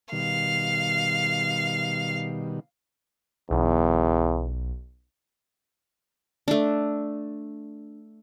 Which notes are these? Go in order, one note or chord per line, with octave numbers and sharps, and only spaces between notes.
B2 D#3 G3 F5
B1 E2
A3 D4